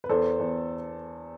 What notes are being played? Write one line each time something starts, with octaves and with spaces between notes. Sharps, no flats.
B4
E2 A4 C5
E2